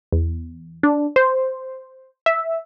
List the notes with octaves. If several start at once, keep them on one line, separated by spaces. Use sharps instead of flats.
E2
D4
C5
E5